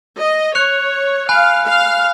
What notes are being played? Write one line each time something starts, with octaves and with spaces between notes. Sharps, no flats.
D#5
C#5 F#6 C#7 F7
F5 G#5 B5 F#6
F5